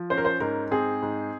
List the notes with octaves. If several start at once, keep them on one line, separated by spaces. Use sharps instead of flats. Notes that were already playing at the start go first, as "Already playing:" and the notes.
Already playing: F3
C#4 C5
A#4
C5
G#2 A#4
C4 G#4
G#2